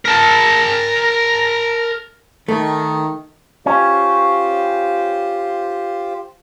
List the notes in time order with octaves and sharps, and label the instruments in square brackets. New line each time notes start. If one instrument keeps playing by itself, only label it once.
[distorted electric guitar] A#4 A5
[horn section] D#3 [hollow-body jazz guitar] A3
[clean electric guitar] C#4 [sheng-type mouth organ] F4 G4 C5